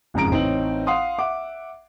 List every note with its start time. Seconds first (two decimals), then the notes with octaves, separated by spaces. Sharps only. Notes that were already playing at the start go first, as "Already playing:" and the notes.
0.14 F#1 F2 G#2 C#3 A#5 D7
0.31 A1 C4 D#4 C#5 F#7
0.87 F5 F#5 C6 D#6
1.18 E5 F#5 D6